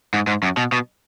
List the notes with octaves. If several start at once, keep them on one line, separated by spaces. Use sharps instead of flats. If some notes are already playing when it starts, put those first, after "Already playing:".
G#2
G#2
F#2
B2
B2